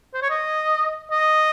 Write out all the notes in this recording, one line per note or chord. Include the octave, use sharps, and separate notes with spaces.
C5
C#5
D#5
D#5